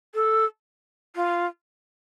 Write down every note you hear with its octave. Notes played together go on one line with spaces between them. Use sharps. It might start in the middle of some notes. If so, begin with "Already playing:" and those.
A4
F4